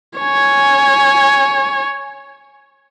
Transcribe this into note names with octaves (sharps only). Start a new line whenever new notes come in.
C#5 G#5